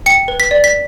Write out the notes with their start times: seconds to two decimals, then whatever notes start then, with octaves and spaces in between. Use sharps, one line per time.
0.06 G5 C#7
0.28 B4
0.40 B6
0.51 D5
0.64 B6